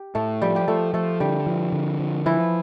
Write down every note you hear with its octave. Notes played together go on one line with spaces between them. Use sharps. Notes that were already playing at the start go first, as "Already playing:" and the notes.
Already playing: G4
A2 A3 A4
F3 G3 G4
G4
F3 A3 A4
F3 A3 A4
D3 G3 G4
F3
D3
F3
E3 F3 E4